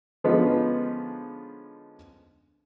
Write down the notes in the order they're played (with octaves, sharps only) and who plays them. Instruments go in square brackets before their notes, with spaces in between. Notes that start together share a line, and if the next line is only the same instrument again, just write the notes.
[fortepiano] D3 F3 G#3 B3 C#4 D#4